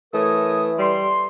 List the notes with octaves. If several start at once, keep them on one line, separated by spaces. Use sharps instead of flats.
E3 A3 A#4 C#5 D#6
G3 C6